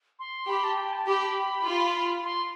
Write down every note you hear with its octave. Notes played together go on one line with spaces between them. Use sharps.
C6
G4 B5
A5
G5
A5
G4 B5
F4
C6